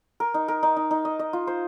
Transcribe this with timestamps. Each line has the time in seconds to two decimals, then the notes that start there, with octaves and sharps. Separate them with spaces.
0.20 A#4
0.34 D#4
0.48 A#4
0.63 D#4
0.77 D#4
0.91 D#4
1.05 D#5
1.19 D#5
1.33 F4
1.47 C5